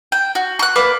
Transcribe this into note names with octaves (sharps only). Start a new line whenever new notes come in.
G5
F#4
C#6 F#6
A#3 B4 D5 D6